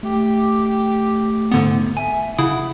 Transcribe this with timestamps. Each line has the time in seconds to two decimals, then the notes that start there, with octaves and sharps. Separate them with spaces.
0.03 A3 G4
1.52 G#2 D3 B3
1.97 E5 G#5
2.39 C#3 E4 F#5 D#6